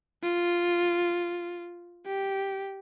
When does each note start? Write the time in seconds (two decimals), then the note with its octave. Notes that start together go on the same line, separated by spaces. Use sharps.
0.23 F4
2.06 G4